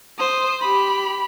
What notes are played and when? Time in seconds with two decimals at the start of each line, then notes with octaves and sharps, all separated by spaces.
0.19 C5 D#6
0.61 G4 B5